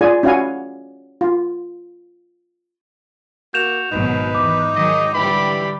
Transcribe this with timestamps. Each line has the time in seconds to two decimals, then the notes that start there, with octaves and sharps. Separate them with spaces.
0.01 F4 G#4 D5 G#5
0.23 C#4 E4 F#4 F5 G#5
1.21 F4
3.54 A#3 F#4 G6 E7 F7
3.92 G#1 B2 F#3 D#4 B4
4.35 E2 D6
4.75 D#3 F#3 G#3 D#5 D6
5.14 D3 E3 G3 G4 B5